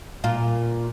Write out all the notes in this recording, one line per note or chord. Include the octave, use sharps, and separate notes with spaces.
A#2 F4